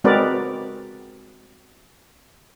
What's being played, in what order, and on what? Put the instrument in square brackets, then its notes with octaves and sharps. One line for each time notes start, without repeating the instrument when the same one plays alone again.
[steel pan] G#3 C4 F#4 A#4 B4 D5